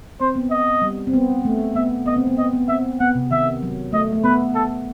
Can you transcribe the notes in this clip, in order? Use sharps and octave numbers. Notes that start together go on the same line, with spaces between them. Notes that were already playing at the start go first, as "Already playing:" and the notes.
C4 C5
B3
D#5
G3
C4
B3
A3
B3 E5
B3 D#5
C4
B3
B3 D#5
B3
C4 E5
B3 F#5
C3
D#3 E5
F#3
A3 D#5
A3
B3 B4
A4